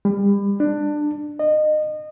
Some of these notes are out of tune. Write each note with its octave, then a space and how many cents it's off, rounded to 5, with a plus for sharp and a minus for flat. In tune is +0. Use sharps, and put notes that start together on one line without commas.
G3 +35
D4 +20
D#5 -25